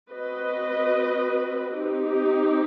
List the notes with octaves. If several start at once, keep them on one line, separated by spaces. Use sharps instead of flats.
C4 F#4 B4 D#5
C4 D#4 G4